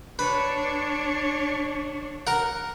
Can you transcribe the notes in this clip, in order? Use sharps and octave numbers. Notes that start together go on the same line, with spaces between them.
D4 B4 C#5
A#4 F#5